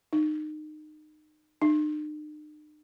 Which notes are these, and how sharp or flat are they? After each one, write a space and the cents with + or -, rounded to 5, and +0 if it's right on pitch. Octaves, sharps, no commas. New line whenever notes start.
D#4 -25
D#4 -45